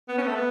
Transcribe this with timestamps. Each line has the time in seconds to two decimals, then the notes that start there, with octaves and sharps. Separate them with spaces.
0.08 B3
0.18 C#4
0.22 B3
0.27 A3
0.35 B3